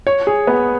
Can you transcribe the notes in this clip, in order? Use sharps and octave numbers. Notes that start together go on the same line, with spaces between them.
C#5
G#4
B3